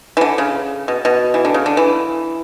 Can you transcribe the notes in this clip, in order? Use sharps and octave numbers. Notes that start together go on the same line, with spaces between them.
E3
D3
C#3
B2
B2
E3
D3
C#3
D3
E3